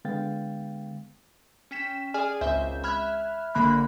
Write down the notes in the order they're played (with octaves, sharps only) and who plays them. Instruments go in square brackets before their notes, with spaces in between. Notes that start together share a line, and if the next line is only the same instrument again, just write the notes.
[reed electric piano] D3 G#3 B3 F5 G5 A6
[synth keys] C#4 G5 B6 E7
G#4 D5 G#5 F6
G#1 C#2 C5 E5 G6
E5 B5 F6 F#6 G#6
A#1 D3 A#3 B5 F#6